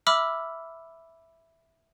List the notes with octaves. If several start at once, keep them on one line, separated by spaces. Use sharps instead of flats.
E5 B5 D6 E6 F6